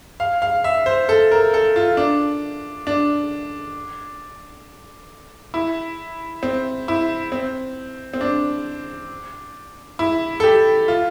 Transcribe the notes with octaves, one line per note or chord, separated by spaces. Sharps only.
F5
F5
E5
C5
A4
A#4
A4
F4
D4
D4
E4
C4
E4
C4
C4
D4
E4
A4
G4
F4